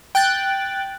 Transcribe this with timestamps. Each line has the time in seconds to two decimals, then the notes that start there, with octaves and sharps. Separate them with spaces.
0.15 G5 F#6 A6